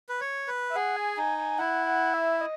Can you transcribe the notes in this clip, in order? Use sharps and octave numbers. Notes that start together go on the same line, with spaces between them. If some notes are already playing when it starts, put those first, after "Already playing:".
B4
C#5
B4
E5
G#4 F#5
G#5
D#4 G#5
G#5
E4 F#5
F#5
E5
D#5